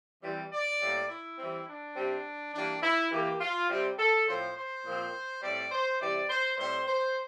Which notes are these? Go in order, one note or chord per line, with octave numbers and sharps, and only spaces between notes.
E3 G3 C4
D5
A2 G3 A#3
E4
E3 G3 C4
D4
C3 G3 C4
E3 G3 A#3 D4
E4
E3 A#3 G4
F4
C3 G3 C4
A4
A2 F3 C4 C5
C5
A#2 F3 C4
A2 G3 C4 D5
C5
C3 E3 G3 C4 D5
C5
A2 G3 C4 C5
C5